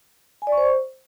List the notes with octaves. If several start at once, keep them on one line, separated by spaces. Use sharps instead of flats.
G#5
D5
C#6
C5